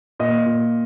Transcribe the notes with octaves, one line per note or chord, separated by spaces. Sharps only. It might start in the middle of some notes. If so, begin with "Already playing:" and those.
A#2 D#5
A#2